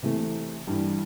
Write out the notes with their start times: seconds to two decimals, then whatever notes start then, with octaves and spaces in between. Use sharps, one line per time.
0.03 C3 E3 A3
0.67 G2 E3 G3